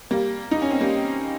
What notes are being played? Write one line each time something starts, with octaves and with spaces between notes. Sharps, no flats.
G3 A#3
D#4
C#4
C4
G3 A#3